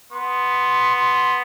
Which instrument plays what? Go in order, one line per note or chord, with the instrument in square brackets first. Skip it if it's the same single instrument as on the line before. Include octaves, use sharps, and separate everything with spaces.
[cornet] B3 [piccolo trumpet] C6
[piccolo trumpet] C6